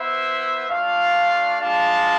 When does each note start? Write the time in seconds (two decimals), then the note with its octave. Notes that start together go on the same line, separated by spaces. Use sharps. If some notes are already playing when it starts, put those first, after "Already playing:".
Already playing: B3 E4 C5 E5
0.67 A3 D4 F4 D5 F5
1.60 G#3 D4 F4 F5 A5